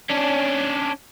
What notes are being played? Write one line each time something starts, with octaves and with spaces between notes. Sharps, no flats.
C#4 D4